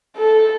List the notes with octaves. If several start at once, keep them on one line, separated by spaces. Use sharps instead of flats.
A4